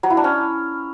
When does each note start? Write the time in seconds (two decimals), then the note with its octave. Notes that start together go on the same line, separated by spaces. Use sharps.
0.03 F#3
0.10 E4
0.17 D4
0.24 C#4